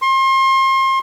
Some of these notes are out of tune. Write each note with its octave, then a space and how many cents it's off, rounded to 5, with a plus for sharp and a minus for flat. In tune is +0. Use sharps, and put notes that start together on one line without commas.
C6 +35